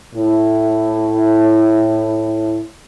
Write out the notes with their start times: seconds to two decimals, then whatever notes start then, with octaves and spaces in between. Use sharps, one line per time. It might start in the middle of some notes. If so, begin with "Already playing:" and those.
0.15 A2 E4